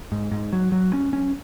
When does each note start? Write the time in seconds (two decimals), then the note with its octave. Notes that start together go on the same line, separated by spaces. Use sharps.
0.12 G#2
0.31 G#2
0.53 F#3
0.72 F#3
0.93 C#4
1.13 C#4